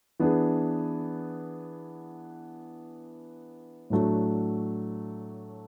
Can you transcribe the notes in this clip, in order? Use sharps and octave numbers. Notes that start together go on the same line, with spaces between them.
E3 B3 D4 G#4
A2 F#3 A3 D4 F#4